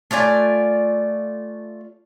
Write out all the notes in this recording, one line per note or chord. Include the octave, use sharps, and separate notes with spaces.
A3 F4 D5 G#5